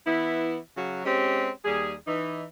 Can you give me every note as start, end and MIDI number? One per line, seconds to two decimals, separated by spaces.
0.05 0.56 52
0.05 0.56 59
0.05 0.56 64
0.76 1.02 49
0.76 1.02 54
0.76 1.02 66
1.04 1.49 56
1.04 1.49 60
1.04 1.49 61
1.04 1.49 67
1.64 1.94 39
1.64 1.94 55
1.64 1.94 68
2.07 2.43 52
2.07 2.43 63